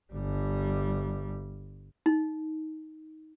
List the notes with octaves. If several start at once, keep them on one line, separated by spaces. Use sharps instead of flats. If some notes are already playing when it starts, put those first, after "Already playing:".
G1 G3
D#4